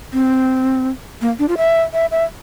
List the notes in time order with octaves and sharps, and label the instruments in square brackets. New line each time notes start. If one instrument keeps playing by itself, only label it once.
[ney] C4
A#3
D4
F4
E5
E5
E5